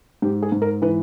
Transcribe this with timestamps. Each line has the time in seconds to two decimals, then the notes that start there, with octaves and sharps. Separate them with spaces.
0.22 G#2 G4
0.43 G#4
0.52 G#2
0.62 A#4
0.82 E3 B4